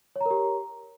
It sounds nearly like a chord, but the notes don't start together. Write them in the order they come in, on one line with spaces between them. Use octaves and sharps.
C#5 A#5 A#4 G4